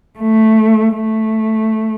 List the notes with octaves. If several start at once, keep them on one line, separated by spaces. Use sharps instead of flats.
A3
A3